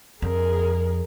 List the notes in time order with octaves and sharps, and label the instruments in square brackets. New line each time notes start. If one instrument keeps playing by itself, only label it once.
[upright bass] F2 [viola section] G#4 A#4